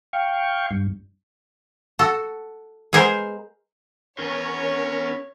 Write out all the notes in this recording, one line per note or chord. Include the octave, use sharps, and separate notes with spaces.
F5 G5 C#6
G2
F#4 A4
G#3 B3 G#4 A#4 C5
E2 B3 C#4 A#4 C#5